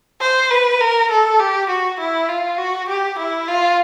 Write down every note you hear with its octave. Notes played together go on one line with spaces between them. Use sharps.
C5
B4
A#4
A4
G4
F#4
E4
F4
F#4
G4
E4
F4